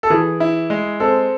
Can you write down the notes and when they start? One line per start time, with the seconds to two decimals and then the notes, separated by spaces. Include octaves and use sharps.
0.03 A4
0.10 E3 G#4
0.40 E4
0.70 G#3
1.00 C4 A4